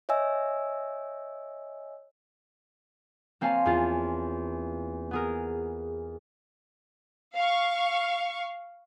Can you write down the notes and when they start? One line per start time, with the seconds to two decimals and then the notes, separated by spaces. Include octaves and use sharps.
0.09 C#5 D#5 E5 G#5 E6
3.41 A#3 C4 C#5 F5 G#5 A5
3.65 E2 F4
5.11 B3 G#4 A#4
7.36 F5 C#6